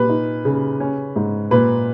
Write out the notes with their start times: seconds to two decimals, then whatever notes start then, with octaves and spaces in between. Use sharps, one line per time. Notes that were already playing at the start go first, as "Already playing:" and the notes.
Already playing: A#2 B4
0.10 D#4
0.45 C#3
0.80 C#4
1.16 G#2
1.51 A#2 B4